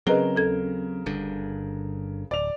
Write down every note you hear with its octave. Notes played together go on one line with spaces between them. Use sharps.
C#3 F#3 C4 G#4 A#4 B4 D#5 G7
D#2 A4 G#6
G1 G2 D3
D1 D5 F7